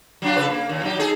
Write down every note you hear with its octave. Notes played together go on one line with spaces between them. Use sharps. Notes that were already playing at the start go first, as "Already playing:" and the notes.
F#3 D4 F4
C#3 A4 B4
A#3
D#2 A#2
F#3 D#4 G4
D#4 G#4 A4